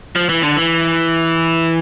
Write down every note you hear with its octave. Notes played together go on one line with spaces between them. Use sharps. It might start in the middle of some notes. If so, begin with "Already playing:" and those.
F3
E3
D3
E3